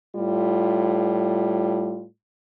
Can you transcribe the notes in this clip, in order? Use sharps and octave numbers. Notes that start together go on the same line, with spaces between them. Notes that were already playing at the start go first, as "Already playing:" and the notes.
A2 G3 F4